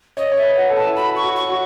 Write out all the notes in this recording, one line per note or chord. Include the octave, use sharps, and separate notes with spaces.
C#5 D#5
C#5
E5
B4
F#5
A4
A5
E4
F#4 B5
C#6
F#4
C#6
F#4